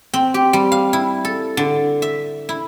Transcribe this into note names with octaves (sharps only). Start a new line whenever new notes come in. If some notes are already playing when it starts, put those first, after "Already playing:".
C4
G4
G3
F5
E4
A4
D3
E5
E4